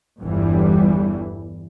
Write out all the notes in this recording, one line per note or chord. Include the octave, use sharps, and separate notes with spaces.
G1 E2 G2 E3 G3